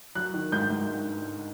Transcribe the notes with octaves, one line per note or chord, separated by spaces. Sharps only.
F#3 F#6
D#3
G#2 G6
G#2